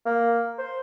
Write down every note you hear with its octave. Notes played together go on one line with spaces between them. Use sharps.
A#3
C5